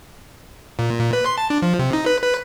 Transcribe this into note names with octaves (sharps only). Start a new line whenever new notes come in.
A#2
A#2
B4
C6
A5
D4
F3
C3
D#4
B4
B4